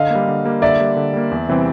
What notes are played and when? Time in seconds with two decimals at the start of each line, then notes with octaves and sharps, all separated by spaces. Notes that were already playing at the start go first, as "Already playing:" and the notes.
Already playing: D3 D#5 F5
0.10 G3 A#3
0.28 D3
0.45 G3 A#3
0.62 D3 D5 E5
0.80 G3 A#3
0.97 D3
1.13 G3 A#3
1.31 E2
1.49 C3 E3 G3 C4